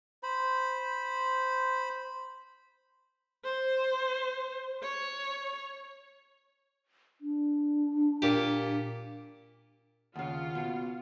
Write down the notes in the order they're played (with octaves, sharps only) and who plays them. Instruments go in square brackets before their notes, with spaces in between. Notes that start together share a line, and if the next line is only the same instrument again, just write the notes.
[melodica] C5 B5
[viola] C5
C#5
[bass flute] D4
[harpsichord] A#2 G4
[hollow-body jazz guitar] D#2 C#3 [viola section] F4 [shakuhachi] F#5
[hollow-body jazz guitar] B2